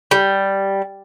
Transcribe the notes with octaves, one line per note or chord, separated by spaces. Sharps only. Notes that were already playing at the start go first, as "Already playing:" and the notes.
G3